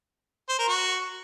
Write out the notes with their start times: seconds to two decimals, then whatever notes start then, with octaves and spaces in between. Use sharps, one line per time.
0.49 C5
0.58 A#4
0.68 F#4